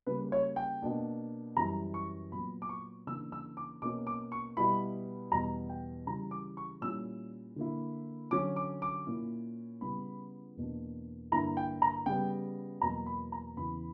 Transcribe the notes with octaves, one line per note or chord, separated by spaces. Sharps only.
C#3 G3 A#3 B4
C#5
G5
B2 A#3 D4
F#2 E3 G3 A#5
C#6
A#2 F#3 B3 B5
D6
C#6
C#3 E3 A#3 D4 E6
E6
D6
B2 A#3 C#4 D6
D6
C#6
B2 G3 B3 E4 B5
E2 B2 G3 B3 A#5
G5
C#3 E3 G3 A#5
D6
C#6
A#2 G3 C#4 E4 E6
D3 A#3 E4
D3 F#3 C#4 D6
D6
D6
A#2 A#3 C#4 E4
C#3 G3 B3 E4 B5
E2 B2 A#3 D4
G2 D3 A#3 E4 A#5
G5
A#5
C#3 G3 B3 G5
E2 B2 F#3 A#3 A#5
B5
A#5
E2 C#3 E3 B5